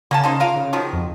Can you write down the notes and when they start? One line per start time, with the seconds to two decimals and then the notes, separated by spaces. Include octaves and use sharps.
0.11 C#3 A#3 C#4 A5
0.23 A#3 D#4 C5
0.40 F4 A#4 F5
0.56 C#3
0.73 D#3 F3 F#3
0.93 F2